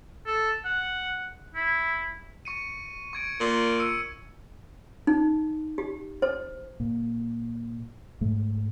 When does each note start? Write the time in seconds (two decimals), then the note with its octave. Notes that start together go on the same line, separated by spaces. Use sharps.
0.26 A4
0.65 F#5
1.55 E4
2.45 C#6 C#7 D#7
3.13 C#6 G#6 D7
3.40 A#2
3.79 E6 C#7 D#7
5.07 D#4
5.78 G4
6.22 C5
6.80 A#2
8.21 G#2 A3